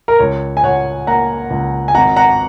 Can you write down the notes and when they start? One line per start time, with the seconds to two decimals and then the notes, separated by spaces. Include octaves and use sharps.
0.08 A#4
0.19 C#2 C#5
0.57 G#5
0.63 C#2 C#5 F#5
1.07 A#3 F#5 A#5
1.50 C#2
1.88 G#5
1.95 G#1 F#5 A#5
2.16 F#5 A#5